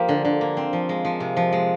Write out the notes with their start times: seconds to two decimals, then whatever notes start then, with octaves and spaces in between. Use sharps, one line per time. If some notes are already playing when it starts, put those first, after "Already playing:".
Already playing: F3 A#3 G4
0.09 D3
0.25 D3
0.41 A#3
0.57 C4
0.73 F3
0.89 G#3
1.05 F3
1.20 C3
1.37 F3
1.52 G#3